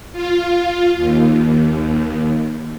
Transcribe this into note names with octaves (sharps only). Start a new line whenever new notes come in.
F4
D#2